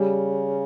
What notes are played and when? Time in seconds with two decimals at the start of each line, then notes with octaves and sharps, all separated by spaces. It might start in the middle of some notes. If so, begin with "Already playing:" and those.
Already playing: C#3 G3